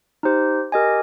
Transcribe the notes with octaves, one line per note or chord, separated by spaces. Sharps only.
D#4 G4 C5
G4 A#4 D#5 G#5